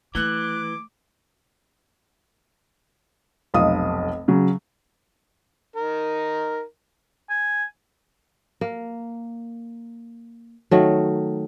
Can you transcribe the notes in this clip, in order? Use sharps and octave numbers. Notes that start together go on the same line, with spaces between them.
E3 A3 D6 F#6
F1 B1 F5 D#6
C#3 F#3
D#4 A#4
G#5
A#3
D#3 F#3 A3